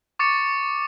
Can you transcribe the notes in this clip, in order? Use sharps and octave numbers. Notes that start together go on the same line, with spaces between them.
C#6 D6 A6 C#7